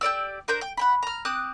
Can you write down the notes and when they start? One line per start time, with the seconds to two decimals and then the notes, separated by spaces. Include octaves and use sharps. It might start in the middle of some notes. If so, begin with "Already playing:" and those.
0.01 G4 A#4 D5 E6
0.48 D4 A#4 C5 G6
0.61 G5
0.77 F#5 G5 B5
1.03 A#5 F6
1.25 C4 D6 D#6 F#6